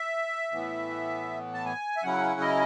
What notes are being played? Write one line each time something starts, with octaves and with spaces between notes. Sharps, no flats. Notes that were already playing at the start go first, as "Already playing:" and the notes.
Already playing: E5
A2 E3 B3
A5
G#5
E5
C#3 F#3 C#4 E4 F#5
D#5